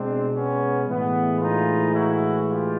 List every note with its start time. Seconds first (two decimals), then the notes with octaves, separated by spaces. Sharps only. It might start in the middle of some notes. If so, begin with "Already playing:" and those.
Already playing: B2 G#3 C4 D4
0.35 B3 C#4
0.88 A2 E3 G#3 B3
1.41 D#4 F4
1.94 E4 F#4
2.47 F4 G4